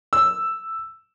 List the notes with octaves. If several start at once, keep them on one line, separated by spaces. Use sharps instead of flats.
E6